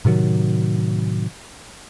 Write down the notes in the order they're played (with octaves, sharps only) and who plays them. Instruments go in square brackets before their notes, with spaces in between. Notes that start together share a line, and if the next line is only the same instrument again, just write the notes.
[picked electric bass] A2 C3 D#3 F#3